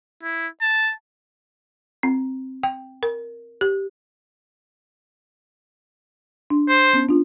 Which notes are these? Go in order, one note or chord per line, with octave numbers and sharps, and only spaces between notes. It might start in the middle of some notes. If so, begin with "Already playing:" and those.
E4
A5
C4
G5
A#4
G4
D4
C5
B3 C#4
D4 F4